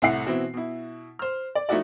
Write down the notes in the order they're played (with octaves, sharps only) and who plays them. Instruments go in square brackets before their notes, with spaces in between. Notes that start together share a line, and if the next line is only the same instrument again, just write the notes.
[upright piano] C2 A2 E5 F#5 C7
B2 E3 C4 E4 F#4
B2 E4
C5 F6
D5
F3 A3 D#4 E4 F#4 D5